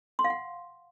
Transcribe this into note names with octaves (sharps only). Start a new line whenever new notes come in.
C6
F5
F#5